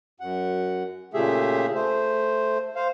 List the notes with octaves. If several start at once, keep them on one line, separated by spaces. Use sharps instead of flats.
F#2 F#5
A#2 C#3 A3 G4 G#4 E5
A3 C5
C5 F5